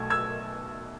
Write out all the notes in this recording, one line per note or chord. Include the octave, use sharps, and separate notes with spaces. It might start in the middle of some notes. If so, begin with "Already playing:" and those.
Already playing: B1 B2 A3 E6 G#6
E6 G#6